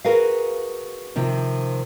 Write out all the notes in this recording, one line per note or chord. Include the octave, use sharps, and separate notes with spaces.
F#4 G#4 A#4 B4 F5
C3 D#3 F3